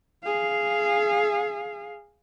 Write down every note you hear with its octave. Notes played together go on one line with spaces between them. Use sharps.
G#4 F5